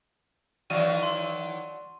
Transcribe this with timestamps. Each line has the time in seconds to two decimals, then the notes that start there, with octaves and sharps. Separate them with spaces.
0.70 D#3 E3 F#3 F#4 D5 F5 D#7
1.03 C6